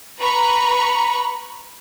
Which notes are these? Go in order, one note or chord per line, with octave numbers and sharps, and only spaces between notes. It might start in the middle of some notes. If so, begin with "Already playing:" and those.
B4 A#5 B5 C#6